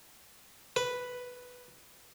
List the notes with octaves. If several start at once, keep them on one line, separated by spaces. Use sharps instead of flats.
B4